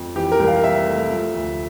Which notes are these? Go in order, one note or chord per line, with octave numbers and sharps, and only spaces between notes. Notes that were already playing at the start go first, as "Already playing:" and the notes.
Already playing: F2
E3 G4
A#4
C2
F5
C3 E5
A3
F3
D2